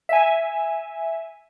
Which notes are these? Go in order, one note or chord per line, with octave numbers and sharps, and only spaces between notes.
E5 G#5